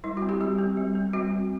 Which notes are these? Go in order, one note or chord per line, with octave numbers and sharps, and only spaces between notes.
G3 E4
F#4
C4
G4
G3 G4
C4
G3
C4
G3 F#4
C4